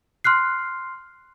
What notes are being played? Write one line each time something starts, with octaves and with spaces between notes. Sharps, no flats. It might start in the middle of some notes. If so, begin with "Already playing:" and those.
C6 F6 F#6 C7